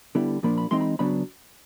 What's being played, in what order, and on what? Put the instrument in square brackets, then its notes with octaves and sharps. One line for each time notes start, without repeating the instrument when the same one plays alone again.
[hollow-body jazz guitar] D3 G3 B3 E4
A#2 F3 A#3 D4 B5
B5
E3 G#3 C4 D#4 C6
B5
C#3 F#3 B3 D4 B5